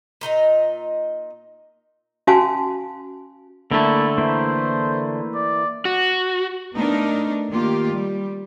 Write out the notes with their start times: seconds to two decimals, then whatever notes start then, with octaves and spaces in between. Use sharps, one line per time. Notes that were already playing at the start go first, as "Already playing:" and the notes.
0.21 A#2 D#4 D#5 A#5
2.27 C#4 F#4 F5 G#5 A5 C6
3.71 D3 A3 A#3 E4 A5
4.18 E3 A#3 E4 C5
5.35 D5
5.85 F#4
6.74 A3 B3 D4 D#4 A#4
7.50 D#3 A#3 F4 G4
7.95 G3